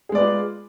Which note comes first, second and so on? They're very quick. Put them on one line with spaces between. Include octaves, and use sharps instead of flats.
G#4 G#3 D5 B4 F4